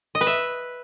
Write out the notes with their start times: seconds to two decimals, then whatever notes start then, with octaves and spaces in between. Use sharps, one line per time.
0.15 D#5
0.21 B4
0.27 E5